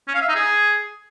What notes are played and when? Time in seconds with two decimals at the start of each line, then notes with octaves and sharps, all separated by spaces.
0.08 C#4
0.15 F5
0.22 E5
0.28 D#4
0.35 G#4